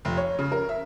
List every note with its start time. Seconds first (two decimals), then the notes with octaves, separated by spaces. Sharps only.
0.05 F1
0.17 C#5
0.39 C#3
0.52 A#4
0.69 E5